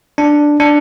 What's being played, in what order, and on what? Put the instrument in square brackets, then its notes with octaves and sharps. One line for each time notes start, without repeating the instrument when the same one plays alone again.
[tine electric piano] D4
D4